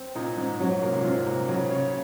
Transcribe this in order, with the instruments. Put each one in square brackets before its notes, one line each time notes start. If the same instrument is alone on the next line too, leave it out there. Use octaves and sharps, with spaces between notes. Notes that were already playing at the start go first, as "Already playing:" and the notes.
Already playing: [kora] C4
[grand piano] A#2 [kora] D#4
[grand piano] G#2 [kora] D#4
[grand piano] G#2 [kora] F#3
[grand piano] C3 [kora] A#3
[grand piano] A#2
[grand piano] G#2 [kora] F4
[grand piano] C3 [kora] A#3
[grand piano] C#3 [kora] F#3
[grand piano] C#3 [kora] C#5